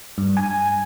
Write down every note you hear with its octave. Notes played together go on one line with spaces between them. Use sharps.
G2
G#5